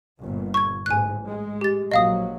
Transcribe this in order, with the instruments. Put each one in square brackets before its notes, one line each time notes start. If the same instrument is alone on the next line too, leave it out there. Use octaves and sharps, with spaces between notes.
[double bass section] G1 A#2
[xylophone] C#6 G#6
[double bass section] A1 G#2 [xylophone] G#5 F#6
[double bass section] G#3
[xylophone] G4 A6
[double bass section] A#1 F#3 [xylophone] D#5 F5 D#6